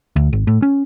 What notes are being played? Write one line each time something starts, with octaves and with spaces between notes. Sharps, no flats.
D2
G#1
A2
C#4